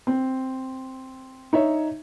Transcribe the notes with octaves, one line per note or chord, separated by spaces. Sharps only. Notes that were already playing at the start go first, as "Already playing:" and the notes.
C4
D#4 C#5 E5